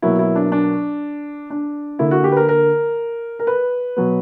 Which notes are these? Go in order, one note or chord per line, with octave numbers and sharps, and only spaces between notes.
B2 F#3 A#3 E4
E4
D4
D4
D4
D3 A#3 E4
F#4
G4
B4
A#4
A#4
A#4
B4
B2 F#3 B3